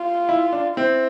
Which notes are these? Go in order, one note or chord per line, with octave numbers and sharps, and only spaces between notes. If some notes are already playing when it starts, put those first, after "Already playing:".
Already playing: F4
E4
D4
C4 E4